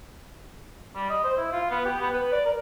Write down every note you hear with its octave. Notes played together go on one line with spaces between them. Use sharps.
G3
D#5
C5
E4
F4
B3
G4
B3
B4
D5
A#4